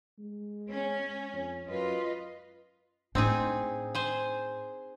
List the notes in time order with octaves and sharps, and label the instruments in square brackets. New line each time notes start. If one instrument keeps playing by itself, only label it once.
[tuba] G#3
[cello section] C#4
[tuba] F2
[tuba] F#2 [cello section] F4 B4 D#5
[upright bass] A2 D4 [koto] C4 D#4 G#4
[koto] G#4 C5